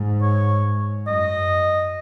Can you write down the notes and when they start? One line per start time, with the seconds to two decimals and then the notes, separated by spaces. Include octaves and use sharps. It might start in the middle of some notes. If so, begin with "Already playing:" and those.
Already playing: G#2
0.21 C#5
1.07 F#2 D#5